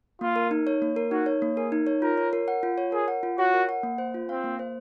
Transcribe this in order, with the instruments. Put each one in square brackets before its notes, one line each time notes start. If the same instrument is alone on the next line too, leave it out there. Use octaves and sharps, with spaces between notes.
[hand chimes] A#3 [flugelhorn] F4
[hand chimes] A#4
D#4
C#5
A#3
A#4
[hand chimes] D#4 [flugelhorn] F#4
[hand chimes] C#5
A#3
[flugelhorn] G#4 [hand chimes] A#4
[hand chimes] D#4
C#5
[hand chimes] F4 [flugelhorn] A#4
[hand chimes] C#5
A#4
F#5
F4
C#5
[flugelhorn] G#4 [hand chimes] A#4
[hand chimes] F#5
F4
[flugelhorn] F#4 [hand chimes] C#5
[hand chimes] A#4
F#5
A#3
C5
F4
[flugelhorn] C4 [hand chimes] F5
[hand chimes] A#3
C5